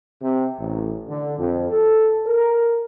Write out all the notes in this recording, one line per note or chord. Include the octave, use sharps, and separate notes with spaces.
C3
A1
D3
F2
A4
A#4